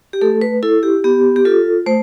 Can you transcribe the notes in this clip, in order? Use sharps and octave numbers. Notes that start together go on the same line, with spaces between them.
G4
A3 A4
B4
E4 A4
G4
B3 G4
G4
F4 A4
A3 C5